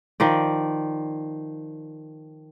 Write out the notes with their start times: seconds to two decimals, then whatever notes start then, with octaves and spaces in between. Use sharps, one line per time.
0.20 D#3 F3 D5